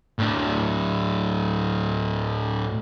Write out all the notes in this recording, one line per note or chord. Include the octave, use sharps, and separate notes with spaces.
A2 D4